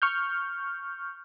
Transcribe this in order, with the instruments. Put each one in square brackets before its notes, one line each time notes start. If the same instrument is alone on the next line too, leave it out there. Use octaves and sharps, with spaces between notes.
[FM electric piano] C#6 F6 G6